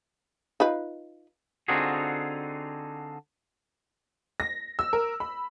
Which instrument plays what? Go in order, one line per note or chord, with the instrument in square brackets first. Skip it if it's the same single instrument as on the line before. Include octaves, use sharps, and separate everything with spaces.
[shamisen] D#4 F4 B4
[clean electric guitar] D3 C4 D#4 F4 F#4 G#4
[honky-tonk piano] A#6
E6
A#4
B5